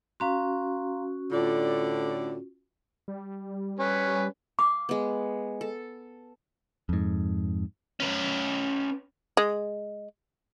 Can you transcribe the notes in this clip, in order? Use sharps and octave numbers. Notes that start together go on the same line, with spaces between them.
C#4 F#4 F5 A#5 C6
A2 D3 F4 D5
G3
C#4 B4
F5 D6
G#3 B3
A4
F2 G#2
C#4 B4
G#3